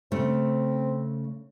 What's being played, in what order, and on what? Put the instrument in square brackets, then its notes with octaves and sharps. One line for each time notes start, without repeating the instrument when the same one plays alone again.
[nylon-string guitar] C#3 A3 [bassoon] C4